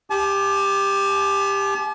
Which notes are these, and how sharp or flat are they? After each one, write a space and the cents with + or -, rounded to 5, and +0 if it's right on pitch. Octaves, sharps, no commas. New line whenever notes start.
G4 +15 A5 -45